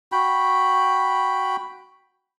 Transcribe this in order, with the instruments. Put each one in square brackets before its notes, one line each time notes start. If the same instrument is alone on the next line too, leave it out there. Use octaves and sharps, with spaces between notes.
[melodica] F#4 G5 B5